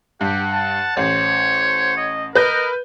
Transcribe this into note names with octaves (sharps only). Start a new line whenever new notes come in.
G2 G4 F#5
A5
A1 C5 C#5
D#5
A#4 B4 D#5 G6